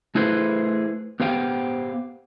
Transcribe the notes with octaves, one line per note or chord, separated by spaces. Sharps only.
A3 E4 G#4 B4 C5
B3 G4 C5 F5 G5